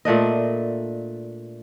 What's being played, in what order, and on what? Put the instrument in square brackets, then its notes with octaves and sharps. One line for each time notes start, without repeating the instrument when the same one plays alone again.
[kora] A#2 A3 D4 D#5